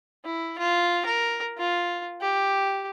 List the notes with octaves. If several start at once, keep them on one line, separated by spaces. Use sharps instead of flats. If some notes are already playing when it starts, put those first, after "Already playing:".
E4
F4
A#4
F4
G4